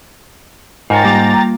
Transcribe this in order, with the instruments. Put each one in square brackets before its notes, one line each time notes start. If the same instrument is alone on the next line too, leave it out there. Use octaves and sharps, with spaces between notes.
[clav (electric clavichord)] G#2 [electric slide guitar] F4 A#4 C#5 [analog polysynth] G5 A#5 A6
[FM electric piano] G3 D6 [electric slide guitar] A#3 F4